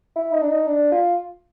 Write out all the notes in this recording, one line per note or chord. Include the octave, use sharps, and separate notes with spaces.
E4
D#4
D4
D#4
D4
F4